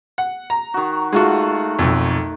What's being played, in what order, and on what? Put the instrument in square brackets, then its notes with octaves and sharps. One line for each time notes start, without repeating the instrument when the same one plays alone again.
[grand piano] F#5
A#5
[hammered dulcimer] D#3 F#4
[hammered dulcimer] D#3 A3 [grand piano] G#3 F4 F#4
[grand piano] B1 F2